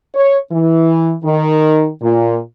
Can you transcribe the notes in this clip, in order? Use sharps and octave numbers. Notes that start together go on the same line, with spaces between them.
C#5
E3
D#3
A#2